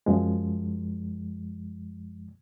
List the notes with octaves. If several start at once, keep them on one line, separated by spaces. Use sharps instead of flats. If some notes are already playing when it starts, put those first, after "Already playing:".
F#2 F3 G#3